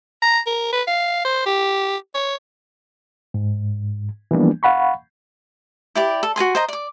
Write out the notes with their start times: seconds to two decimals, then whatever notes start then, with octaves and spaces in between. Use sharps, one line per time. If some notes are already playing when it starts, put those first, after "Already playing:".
0.22 A#5
0.47 A#4
0.73 B4
0.87 F5
1.25 C5
1.46 G4
2.14 C#5
3.34 G#2
4.31 E3 F3 G3 A#3 B3 D4
4.63 F5 F#5 B5 C#6
5.95 E4 G4 D5
6.23 A4
6.36 F#4 B4 G#5 C6
6.55 C5 D#5 A#5
6.68 D5 D6